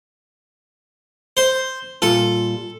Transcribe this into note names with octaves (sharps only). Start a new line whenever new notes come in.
C5
A#2 G3 F4 A4